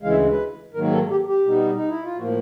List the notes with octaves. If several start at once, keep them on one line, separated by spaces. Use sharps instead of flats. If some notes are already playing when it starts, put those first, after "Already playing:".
D2 C#3 E3 G#3 F5
E5
B4
G#2 D#3 F#3 A#3 A#4
A4
G4
G4
B2 G3 B3 D#4
D#4
E4
F4
A2 F3 A#3 F#4